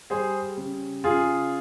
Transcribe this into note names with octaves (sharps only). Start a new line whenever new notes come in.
G3 G#4 C5
C#3
C#3 F4 G#4